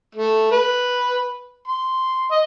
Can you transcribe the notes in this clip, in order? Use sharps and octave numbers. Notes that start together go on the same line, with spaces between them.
A3
B4
C6
D#5